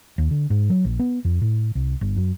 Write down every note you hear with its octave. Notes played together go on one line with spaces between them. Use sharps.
D#2
D3
G#2
F#3
A#1
B3
F2
A2
C2
G1
F#2